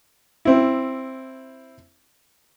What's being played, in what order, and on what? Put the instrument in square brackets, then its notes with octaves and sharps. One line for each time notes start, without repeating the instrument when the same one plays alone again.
[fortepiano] C4 E4